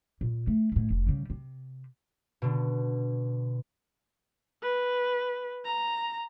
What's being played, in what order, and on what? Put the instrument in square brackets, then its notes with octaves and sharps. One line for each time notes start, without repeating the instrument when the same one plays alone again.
[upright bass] A#2
A3
F#1 A2
F1
C#3 G3
C3
[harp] B2 D3
[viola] B4
A#5